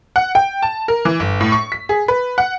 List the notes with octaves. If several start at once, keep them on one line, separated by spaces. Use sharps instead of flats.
F#5
G5
A5
A#4
E3
G1
A2
C#6
B6
G#4
B4
F#5